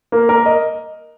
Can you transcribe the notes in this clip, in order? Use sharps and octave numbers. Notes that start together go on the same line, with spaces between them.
A#3
A#4
D#5